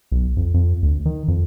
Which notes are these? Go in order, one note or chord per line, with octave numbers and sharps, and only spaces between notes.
B1
F2
F2
D2
D#3
F2